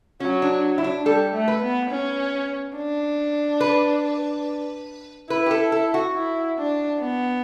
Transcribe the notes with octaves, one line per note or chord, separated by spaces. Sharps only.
F#3 C#4
D4
E4
D4
G3 A4
A3
B4
B3
C#4
D4
B4
E4 B4
G4
A4
A4
F#4
E4
D4
B3